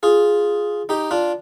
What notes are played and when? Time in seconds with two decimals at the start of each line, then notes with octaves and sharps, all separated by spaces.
0.03 F4 G#4
0.89 D#4 G4
1.11 D4 F4